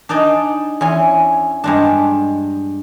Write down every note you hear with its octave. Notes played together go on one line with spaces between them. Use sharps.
D4 D#4 D5 D#5 G#5
E2 C#4 G#5 C6
G2 G#3 D4